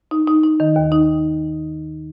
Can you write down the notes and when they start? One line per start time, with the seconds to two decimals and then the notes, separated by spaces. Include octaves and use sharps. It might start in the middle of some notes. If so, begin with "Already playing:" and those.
0.11 D#4
0.28 D#4
0.43 D#4
0.60 D#3
0.76 D#2
0.92 D#4